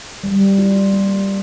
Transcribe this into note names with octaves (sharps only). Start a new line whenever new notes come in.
G3
F4
A#3